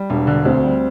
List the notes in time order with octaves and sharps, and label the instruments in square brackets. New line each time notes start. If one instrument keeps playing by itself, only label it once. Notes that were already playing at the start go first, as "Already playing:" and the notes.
Already playing: [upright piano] G3
[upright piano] E1 [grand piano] D4
[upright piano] D3
[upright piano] D2 [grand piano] C4
[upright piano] G3